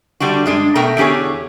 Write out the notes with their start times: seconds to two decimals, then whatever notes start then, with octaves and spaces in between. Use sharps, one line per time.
0.20 D3 G3 D4 F#4
0.46 G2 G#3 D4
0.75 B2 A3 A#4 G5 A#5
0.97 E2 D3 G4 G#4 C#5